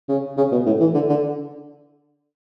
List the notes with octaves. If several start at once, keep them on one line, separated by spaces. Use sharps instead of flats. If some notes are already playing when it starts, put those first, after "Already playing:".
C#3
C#3
B2
A2
E3
D3
D3